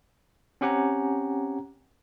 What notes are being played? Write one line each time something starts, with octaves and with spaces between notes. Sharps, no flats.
C4 C#4 G4 F#5 G#5 A#5